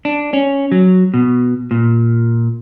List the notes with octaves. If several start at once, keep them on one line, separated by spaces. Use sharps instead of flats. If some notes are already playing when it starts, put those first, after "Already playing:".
D4
C#4
F#3
B2
A#2